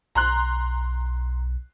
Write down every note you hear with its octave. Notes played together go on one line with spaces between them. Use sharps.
B1 A#5 C6 F#6